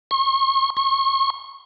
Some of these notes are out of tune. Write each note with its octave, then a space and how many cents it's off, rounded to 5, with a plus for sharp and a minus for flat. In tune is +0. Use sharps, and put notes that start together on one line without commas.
C#6 -40
C#6 -35